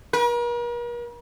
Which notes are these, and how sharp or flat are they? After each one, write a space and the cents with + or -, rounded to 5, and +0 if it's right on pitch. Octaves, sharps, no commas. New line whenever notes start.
A#4 +45